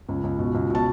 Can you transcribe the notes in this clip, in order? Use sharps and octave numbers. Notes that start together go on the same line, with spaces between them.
C#2
C#2
B2
C#2
B2 A5